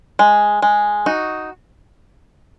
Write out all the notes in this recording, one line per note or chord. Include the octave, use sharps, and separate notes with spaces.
G#3
G#3
D#4 F#4